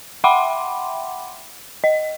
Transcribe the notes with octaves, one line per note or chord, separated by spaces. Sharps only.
E5 F#5 G5 B5 C6 D6
D#5